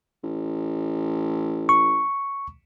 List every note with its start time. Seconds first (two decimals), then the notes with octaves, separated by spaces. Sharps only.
0.24 A1
1.69 C#6